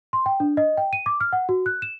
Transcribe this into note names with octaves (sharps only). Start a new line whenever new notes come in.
C6
G5
D4
D#5
G5
D#7
D6
F6
F#5
F#4
F#6
E7